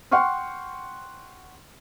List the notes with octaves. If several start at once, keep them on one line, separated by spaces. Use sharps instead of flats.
F#5 G5 C6 C#6 F6